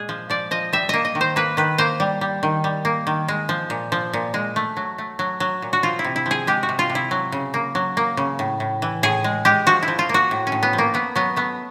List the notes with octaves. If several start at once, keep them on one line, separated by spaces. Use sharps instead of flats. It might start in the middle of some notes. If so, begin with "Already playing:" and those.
Already playing: A#2 G#3 G#4
F3
F3 D5
F3 D#5
G3 E5
A#3 D#5
D#5
D#3
C5
A#3 B4
D#3 B4
A#3 C5
G3
G3
D#3
G3
A#3
D#3
G#3
F3
A#2
F3
A#2
G#3
A3
F#3
A3
F#3
F#3
A#2
F#4
F3 F4
E4
C3
E4
F3
G#4
G#3 G4
F#4
C3
F4
C3
E4
F#3
C#3
A#3
F#3
A#3
C#3
A2
A2
E3
A2 G#4
G#3
G#3 G4
F3 F#4
E4
F3
F4
A#3 F#4
A2
C#4
A2
B3
F3
A#3
A3 B3
F#3 B3
A3 B3